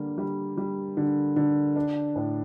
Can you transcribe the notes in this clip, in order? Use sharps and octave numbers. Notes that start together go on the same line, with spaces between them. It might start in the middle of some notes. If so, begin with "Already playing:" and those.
Already playing: D3 G3 A#3
G3
G3
D3
D3
D4
A2